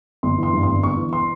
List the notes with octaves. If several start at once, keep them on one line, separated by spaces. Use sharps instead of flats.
G1 C6
E3
C6
G2
G1 C6
G1 C#6
E3
C6